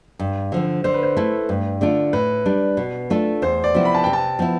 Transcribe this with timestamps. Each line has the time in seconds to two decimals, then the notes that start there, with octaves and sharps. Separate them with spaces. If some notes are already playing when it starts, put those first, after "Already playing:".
0.19 G2
0.52 D3 F3 C4
0.84 D3 C5
0.94 B4
1.03 C5
1.17 A3 E4 A4
1.49 G2
1.81 D3 A3 D4 F4
2.13 A2 B4
2.46 G3 D4
2.77 B2
3.10 A3 D4 F4 A4
3.42 E2 C5
3.64 D5
3.74 C3 F3 B3 E4
3.85 B5
3.94 A5
4.04 C3 G5
4.13 A5
4.39 F3 B3 E4